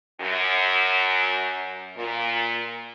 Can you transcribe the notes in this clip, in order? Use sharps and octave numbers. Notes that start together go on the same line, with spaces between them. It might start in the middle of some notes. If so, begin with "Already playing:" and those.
F#2
A#2